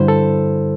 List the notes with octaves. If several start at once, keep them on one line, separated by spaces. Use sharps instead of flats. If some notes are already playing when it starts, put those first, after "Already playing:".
Already playing: G2 D3 G3 E4 C5
A4